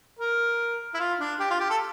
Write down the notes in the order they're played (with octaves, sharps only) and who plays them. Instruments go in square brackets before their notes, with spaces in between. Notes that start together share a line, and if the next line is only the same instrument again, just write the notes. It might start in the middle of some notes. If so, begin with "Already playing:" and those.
[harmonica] A#4
E4
F4
D4
G4
F4
G4
A4